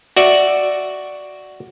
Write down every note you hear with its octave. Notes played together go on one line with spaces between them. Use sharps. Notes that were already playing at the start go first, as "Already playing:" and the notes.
F#4 D5 E5